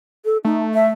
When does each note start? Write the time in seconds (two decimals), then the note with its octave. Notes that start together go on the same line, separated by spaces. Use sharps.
0.25 A4
0.45 A3 D#4
0.74 E5